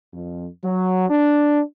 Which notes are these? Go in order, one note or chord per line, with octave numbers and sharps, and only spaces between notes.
F2
F#3
D4